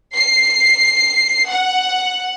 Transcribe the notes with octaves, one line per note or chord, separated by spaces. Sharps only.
C7
F#5